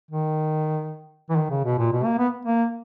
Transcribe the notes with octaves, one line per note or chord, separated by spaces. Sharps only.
D#3
E3
D#3
C#3
B2
A#2
B2
A#3
B3
A#3